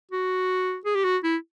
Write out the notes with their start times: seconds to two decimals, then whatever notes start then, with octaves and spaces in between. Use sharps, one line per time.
0.12 F#4
0.85 G#4
0.95 G4
1.04 F#4
1.23 E4